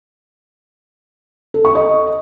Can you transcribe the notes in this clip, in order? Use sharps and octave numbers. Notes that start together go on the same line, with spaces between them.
A4
C#6
D#5